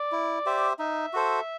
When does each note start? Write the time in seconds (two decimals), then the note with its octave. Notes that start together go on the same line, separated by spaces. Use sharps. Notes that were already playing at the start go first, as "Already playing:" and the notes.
Already playing: D5
0.12 E4
0.46 G4 C5 E5
0.79 D#4 E5
1.13 F#4 A4 C5